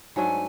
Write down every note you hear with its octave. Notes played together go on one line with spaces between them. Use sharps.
G#2 F#3 A3 D4 G#5